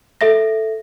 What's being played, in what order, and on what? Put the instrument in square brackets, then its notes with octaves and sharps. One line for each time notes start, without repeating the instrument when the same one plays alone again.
[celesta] A4 E5 A#6